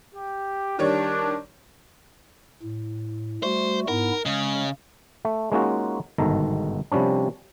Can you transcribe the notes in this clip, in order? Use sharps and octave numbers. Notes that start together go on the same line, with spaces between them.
G4
D#3 G3 D4 C#5
A2
G3 A3 F#4 C5
G#2 B3 E4 A#4
C#3 G#3
A3
G#3 A#3 C#4 D#4 F4 F#4
G1 G#2 B2 D#3 A4 A#5
C3 F3 G3 C#4 D4